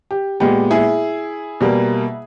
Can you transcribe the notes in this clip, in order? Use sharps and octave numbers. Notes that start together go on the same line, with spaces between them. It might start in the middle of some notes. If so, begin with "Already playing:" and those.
G4
A#2 G#3 B3 G4
E4 G#4
B2 G3 A#3